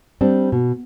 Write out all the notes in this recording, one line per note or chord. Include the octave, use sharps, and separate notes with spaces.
G3 C4 D4
B2